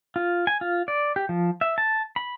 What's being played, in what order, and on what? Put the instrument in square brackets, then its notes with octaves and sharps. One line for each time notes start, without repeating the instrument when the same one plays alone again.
[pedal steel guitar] F4
G#5
F4
D5
G4
F3
E5
A5
B5